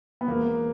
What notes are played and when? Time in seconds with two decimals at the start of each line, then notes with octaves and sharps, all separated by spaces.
0.21 B3
0.28 E1 A#3